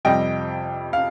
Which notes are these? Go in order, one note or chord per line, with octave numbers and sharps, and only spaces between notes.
F2 C3 G3 D#5 G5
F5